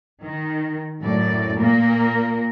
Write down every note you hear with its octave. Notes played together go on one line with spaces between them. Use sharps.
D#3
F#2 A2 D5
A#2 A#3 A#4